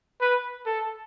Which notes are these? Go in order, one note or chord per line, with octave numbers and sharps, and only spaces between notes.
B4
A4